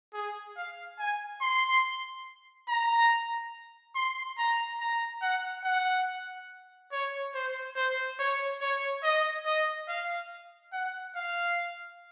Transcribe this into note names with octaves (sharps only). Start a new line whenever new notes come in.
G#4
F5
G#5
C6
A#5
C6
A#5
A#5
F#5
F#5
C#5
C5
C5
C#5
C#5
D#5
D#5
F5
F#5
F5